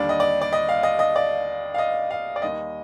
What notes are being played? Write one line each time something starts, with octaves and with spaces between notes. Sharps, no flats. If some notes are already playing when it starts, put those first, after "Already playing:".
Already playing: D#2 D3 G3 D5
D#5
D5
D5
D#5
F5
D#5
D#5
D5
F5
D#5
F5
D5
D#2 D#3 G3 D#5